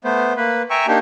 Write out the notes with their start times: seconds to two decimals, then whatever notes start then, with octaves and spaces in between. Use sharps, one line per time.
0.04 A3 B3 C5
0.37 A#3 B4
0.70 E5 G5 G#5 A#5 C#6 E6
0.87 A#3 D4 D#4 G4